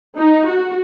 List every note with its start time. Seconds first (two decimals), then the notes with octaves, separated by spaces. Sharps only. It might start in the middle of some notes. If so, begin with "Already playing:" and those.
0.17 D#4
0.47 F#4